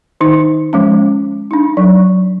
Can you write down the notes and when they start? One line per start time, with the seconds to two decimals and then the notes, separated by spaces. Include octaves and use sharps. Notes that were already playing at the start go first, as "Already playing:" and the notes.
0.21 D#3 D#4
0.73 F3 G#3 C#4
1.51 D4 D#4
1.77 F#3